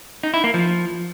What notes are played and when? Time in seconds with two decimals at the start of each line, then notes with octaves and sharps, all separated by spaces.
0.23 D#4
0.34 E4
0.44 A#3
0.54 F3